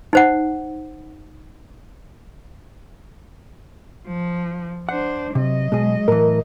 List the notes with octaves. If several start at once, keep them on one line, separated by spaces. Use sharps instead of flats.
D#4 C5 F#5
F3
D4 C5 F#5
C3 F#3 D#5
B2 G#3 G#4
A2 E3 A#4